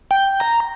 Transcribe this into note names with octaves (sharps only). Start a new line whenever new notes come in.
G5
A#5